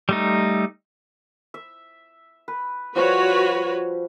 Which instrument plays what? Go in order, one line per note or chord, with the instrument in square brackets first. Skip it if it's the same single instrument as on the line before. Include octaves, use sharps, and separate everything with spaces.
[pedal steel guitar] G3 A3 D#4
[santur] E5
B4
[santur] F3 G3 [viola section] F#4 B4 C#5